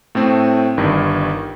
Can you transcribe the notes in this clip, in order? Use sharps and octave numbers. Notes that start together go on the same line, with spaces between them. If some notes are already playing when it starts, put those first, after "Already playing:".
A2 A3 C4
G1 G2 D#3